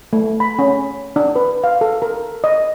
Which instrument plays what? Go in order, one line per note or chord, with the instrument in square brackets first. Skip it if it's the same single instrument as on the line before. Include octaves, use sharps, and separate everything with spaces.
[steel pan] A3
B5
C#4
D4
B4
F5
A4
A#4
D#5